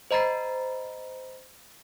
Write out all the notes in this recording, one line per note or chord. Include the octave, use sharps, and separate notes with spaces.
C5 D#5 A#5 B5 A6 C7